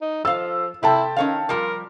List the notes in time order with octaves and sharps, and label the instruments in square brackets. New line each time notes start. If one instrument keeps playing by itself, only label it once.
[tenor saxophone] D#4
[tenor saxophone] F3 [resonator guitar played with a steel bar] A4 F5 [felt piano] E6
[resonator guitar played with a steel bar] C3 [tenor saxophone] E4 [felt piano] A4 G5 A5
[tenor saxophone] D#3 [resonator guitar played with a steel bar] C#4 C#5 F5
[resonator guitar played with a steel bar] F3 G3 [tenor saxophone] A#4